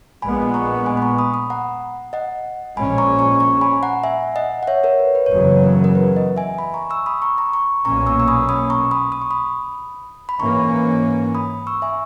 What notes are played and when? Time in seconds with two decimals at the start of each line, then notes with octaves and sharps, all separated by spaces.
0.22 A#1 A#2 G#3 B3 G#5 B5
0.42 B5
0.54 A#5 C#6
0.86 G#5 B5
0.97 B5
1.02 A#5 C#6
1.18 B5 D#6
1.34 B5 D#6
1.50 F#5 A#5
2.13 D#5 F#5
2.77 A#1 A#2 G#3 C#4 G#5 B5
2.98 A#5 C#6
3.19 A#5 C#6
3.40 A#5 C#6
3.61 G#5 B5
3.83 F#5 A#5
4.04 E5 G#5
4.36 D#5 F#5
4.63 F#5
4.67 C#5 E5
4.84 A#4 C#5
5.00 B4
5.15 B4
5.26 C#5
5.31 F#1 E2 C#3 F#3 B4
5.64 A#4
5.84 A#4
5.95 B4
6.16 D#5 F#5
6.37 E5 G#5
6.58 G#5 B5
6.74 A#5 C#6
6.90 C#6 E6
7.06 B5 D#6
7.22 A#5 C#6
7.38 A#5
7.46 B5
7.53 A#5 C#6
7.85 B1 A#2 A#3 C#4 A#5 C#6
8.06 C#6 E6
8.20 E6
8.28 B5 D#6
8.49 B5 D#6
8.70 A#5 C#6
8.91 B5 D#6
9.12 D#6
9.22 C#6
9.31 B5 D#6
10.29 B5
10.39 G#2 E3 A#3 C#4 A#5 C#6
11.35 B5 D#6
11.67 C#6 E6
11.82 E5 G#5